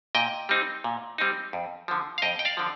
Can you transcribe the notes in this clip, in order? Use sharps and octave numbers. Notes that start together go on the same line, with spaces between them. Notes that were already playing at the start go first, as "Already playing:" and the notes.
A#2 D#5 G5
G3 C4 D#4
A#2
G3 C4 D#4
F2
D3 F3
F5
F2 D#5 G5
G5
D5 F5
D3 F3